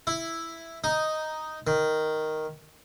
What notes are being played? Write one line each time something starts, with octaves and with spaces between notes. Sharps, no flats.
E4
D#4
D#3